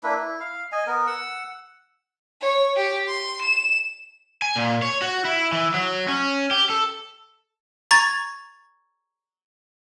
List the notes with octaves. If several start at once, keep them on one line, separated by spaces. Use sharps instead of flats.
A#3 D4 E4 B4
E4
F5
D#5 G#5
B3 A#4
F#5 E6
C#5
G4
C6
E7
G#5
A#2
C#5
F#4
E4
E3
F#3
C#4
G4
A4
A#5 C#6 G#6 A6